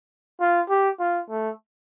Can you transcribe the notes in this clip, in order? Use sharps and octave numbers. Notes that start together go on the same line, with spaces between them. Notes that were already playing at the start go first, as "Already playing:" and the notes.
F4
G4
F4
A3